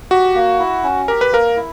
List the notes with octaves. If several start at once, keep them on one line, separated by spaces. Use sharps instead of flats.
F#4 G4
A#3
E4
C#4
G4 A#4
B4
A#3 A#4
E4